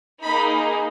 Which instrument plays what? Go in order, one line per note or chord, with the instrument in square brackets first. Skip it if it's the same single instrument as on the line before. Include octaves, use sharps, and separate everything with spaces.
[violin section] A#3 D#4 G#4 B5